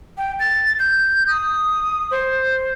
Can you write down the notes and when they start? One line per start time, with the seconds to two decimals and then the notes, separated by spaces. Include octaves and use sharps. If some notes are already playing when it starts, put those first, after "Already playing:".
0.17 G5
0.39 A6
0.79 G6
1.27 D#6
2.11 C5